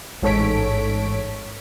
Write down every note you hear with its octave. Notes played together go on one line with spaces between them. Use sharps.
A1 G#2 A4 C#5 B6 D7